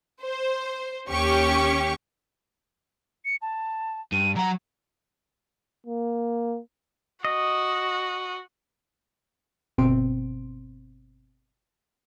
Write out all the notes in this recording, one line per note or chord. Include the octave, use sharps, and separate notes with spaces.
C5
D#2 C#4 G4 C#6
C#7
A5
G2 D#7
F#3 F#5 A#5
A#3
F#4 D#5
G1 B2 C4 C6 D7